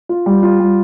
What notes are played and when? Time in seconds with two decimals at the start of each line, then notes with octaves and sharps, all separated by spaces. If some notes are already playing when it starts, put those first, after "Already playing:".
0.09 F4
0.26 G3
0.43 F4
0.60 G3